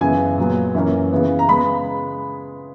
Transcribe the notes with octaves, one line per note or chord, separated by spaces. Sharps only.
F#2 C#3 E3 B3 G#5
A#2 F#3 B3
F#2 E3 A#3 C#4
C#3 E3 B3
A#5
C#3 G#3 B3 B5